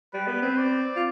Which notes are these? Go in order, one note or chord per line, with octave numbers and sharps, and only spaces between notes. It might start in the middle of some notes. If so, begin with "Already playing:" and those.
G3 B4
B3
C4
D5
F4